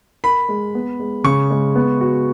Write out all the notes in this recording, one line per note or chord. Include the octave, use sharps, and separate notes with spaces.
A#4 B5
G#3
B3
G#3
C#3 C#6
G#3
B3
F#4